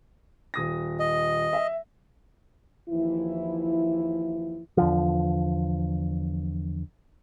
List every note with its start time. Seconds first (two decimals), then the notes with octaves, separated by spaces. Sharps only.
0.54 D#1 D#6 A#6
0.99 D#5
1.53 E5
2.89 D#2 E3 F3 E4
4.77 E2 D3 F3